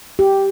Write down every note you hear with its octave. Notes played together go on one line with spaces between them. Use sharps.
G4